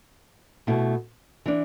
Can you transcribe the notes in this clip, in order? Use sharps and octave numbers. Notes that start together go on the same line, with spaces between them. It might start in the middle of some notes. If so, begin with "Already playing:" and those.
B2 A3 E4
E3 D4